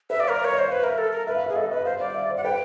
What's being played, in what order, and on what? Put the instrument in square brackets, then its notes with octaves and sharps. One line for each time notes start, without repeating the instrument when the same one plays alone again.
[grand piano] B4 [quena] E5
[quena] D5
[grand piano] F5
[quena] A#4
[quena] C#5 [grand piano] D5
[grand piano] D#5
[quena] C5
[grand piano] F5
[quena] B4
[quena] A#4 [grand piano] E5
[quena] A4
A#4
[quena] B4 [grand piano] E5
[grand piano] F5
E5
[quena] G#4
[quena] A4 [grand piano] D#5
[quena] B4 [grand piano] D#5
[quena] C5 [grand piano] F5
[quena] D5 [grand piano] F5
[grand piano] E5
C5
[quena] F#5
[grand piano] B4 [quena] G5